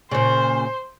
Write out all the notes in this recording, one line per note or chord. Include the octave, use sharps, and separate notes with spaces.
A#2 C#3 C5